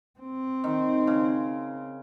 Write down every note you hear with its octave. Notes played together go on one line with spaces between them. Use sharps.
C4
D#3
C#3